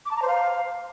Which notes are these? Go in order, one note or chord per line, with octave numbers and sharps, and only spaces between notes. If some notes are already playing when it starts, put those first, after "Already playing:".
D6
A5
A#5
C5
F5